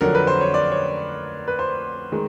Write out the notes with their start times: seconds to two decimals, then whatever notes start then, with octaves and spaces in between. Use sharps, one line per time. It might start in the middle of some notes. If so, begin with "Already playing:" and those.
0.01 F2 D3 F#3 A#4
0.15 B4
0.27 C5
0.41 C#5
0.54 D5
0.71 C#5
1.48 B4
1.59 C5
2.12 D#3 G#3